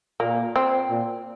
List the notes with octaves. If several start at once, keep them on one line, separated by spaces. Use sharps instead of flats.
A#2 A#3
C4
A#2